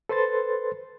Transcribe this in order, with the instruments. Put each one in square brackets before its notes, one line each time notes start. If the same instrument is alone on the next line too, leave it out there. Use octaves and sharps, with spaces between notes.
[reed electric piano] A4 B4 C5 C6 A6